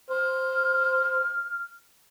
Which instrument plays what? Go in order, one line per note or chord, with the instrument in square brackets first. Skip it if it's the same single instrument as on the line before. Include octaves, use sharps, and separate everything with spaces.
[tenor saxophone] C5 [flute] F6